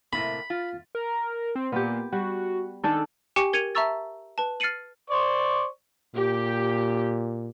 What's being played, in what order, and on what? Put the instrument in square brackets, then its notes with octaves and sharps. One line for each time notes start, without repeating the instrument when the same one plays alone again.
[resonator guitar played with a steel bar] A2 C3 A#3 [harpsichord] B5
[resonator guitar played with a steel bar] F4
[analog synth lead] A#4
C4
[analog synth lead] A#2 [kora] B3 G4
[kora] G3 [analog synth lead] F#4
[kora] D#3 D4 G#4 [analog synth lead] A4
[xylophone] G4 G5 G#5 C#6 D6 C#7
A#4 G#6 C#7 D#7 F7
E5 A5 A#5 C#6 E6 A6
B4 A5
F6 A6 C7 C#7 D#7 F#7
[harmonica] C5 D5 C#6
[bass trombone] A#2 [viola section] G4